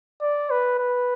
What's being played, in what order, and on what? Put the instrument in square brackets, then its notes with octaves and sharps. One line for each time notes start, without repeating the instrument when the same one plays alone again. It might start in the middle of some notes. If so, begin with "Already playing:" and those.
[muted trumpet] D5
B4
B4